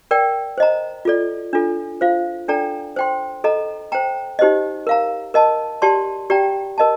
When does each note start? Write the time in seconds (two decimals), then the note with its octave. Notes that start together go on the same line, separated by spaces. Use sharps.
0.11 A#4 D5 G5
0.58 C5 D#5 A#5
1.05 F4 A4 D5
1.53 D4 F4 A4
2.01 F4 C5 F5
2.48 D4 A4 D5 G5 A#5
2.96 C5 G5 C6
3.44 A4 D#5 A#5
3.92 C5 G5 A#5
4.39 D#4 G4 C5 D#5
4.87 A#4 F5 A#5
5.34 A#4 D#5 A5
5.82 G4 D5 A5 C6
6.30 G4 D5 G5 A#5
6.78 A#4 D#5 A5